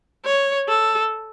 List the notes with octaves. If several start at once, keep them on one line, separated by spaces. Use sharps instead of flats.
C#5
A4